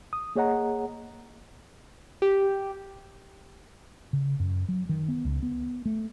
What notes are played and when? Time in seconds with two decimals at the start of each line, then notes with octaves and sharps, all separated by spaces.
0.13 D#6
0.36 A#3 G#4 C#5 D#5 F#5 A#5
2.22 G4
4.13 C#3
4.40 F#2
4.69 F#3
4.89 D#3
5.09 B3
5.25 C#2
5.43 B3
5.86 A3